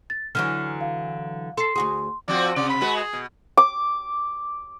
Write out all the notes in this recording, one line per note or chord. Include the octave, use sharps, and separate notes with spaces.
A6
D3 E3 F#3 F6
F5
A4 C6 C7
D2 F#4 G#4 C6
F3 C4 F#4 D5
C3 D5
B5
G#3 F#4 B4
G#4
B2
D6